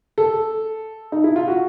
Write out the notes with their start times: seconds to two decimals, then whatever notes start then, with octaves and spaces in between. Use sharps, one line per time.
0.18 A4
1.12 D#4
1.24 E4
1.36 F4
1.48 F#4